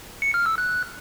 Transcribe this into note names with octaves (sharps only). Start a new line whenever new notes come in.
C#7
F6
E6
F#6